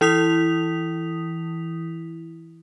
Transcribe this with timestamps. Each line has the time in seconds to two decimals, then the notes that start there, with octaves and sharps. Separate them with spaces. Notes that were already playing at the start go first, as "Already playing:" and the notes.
0.01 E3 E4 D#6 B6 F7